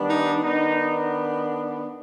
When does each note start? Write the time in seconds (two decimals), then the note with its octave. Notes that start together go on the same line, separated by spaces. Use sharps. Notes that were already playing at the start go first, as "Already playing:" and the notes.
Already playing: D#3 G3 B3 D4
0.08 D#4
0.43 D#3 B3 D4 D#4